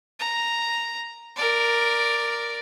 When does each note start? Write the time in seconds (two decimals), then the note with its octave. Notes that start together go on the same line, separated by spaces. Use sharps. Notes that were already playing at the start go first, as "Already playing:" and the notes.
0.20 A#5
1.36 A#4 D5